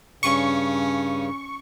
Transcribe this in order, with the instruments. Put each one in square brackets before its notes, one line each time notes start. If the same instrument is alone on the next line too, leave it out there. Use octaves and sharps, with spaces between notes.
[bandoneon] G2 C#3 [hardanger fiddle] C#4 [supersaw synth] C#6